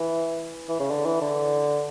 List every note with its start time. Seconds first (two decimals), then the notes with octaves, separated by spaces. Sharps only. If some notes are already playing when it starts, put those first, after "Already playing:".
Already playing: E3
0.69 E3
0.80 C#3
0.91 D3
1.06 E3
1.21 D3